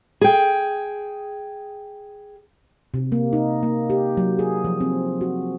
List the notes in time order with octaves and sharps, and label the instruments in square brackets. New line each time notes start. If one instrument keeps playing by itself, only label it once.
[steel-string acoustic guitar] G#4 G5
[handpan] C3
A#3
D#4
A#3
G4
F#3
G#4
F3
C4
F#4